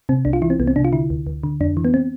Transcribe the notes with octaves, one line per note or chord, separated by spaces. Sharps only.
C3 C4
C2 D4
F4
E3 E4
C4
C2 B3
C4
C3 D4
F4
D3 E4
D2
D2
D3
F2 D4
E3
B3
C4